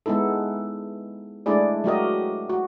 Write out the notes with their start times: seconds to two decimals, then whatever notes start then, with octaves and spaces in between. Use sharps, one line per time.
0.06 G#3 B3 D#4 E4 A4
1.46 G#3 A3 D4 E4 G#4 D5
1.84 F#3 A3 F#4 G4 A#4 D#5
2.50 F#4